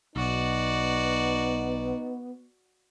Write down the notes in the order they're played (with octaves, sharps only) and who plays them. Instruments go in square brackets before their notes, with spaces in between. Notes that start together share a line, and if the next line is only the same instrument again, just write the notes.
[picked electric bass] B1 [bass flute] B3 [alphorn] D#4 [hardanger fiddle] F#4 D5